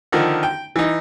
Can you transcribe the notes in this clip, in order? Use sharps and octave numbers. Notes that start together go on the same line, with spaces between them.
D3 D#3 F3
G5
E3 D#4